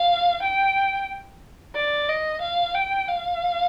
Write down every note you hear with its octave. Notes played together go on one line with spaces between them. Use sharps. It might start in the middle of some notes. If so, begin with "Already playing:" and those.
Already playing: F5
G5
D5
D#5
F5
G5
F5